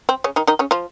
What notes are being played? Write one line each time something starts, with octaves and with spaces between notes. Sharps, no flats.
C4
C#3 C#4
D#3 D#4
D#3 D#4
C#3 C#4
F3 F4